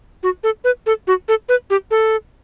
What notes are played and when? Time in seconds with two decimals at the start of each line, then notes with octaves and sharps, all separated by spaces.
0.23 F#4
0.44 A4
0.64 B4
0.86 A4
1.07 F#4
1.28 A4
1.49 B4
1.70 G4
1.91 A4